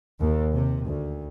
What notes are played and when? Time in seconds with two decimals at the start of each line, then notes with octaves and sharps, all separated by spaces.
0.20 D#2
0.54 C3
0.86 D2